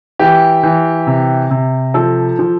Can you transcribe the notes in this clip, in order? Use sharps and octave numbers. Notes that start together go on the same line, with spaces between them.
E3 G4
E3
C3
C3
F3 A4
F3